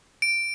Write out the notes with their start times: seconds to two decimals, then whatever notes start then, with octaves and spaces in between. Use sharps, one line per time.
0.22 D7